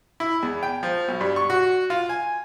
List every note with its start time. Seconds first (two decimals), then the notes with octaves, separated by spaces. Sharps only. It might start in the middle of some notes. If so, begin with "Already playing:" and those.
0.20 E4
0.43 E2
0.63 G5
0.83 F3
1.08 B1
1.21 G2
1.36 C#6
1.50 F#4
1.90 F4
2.09 G#5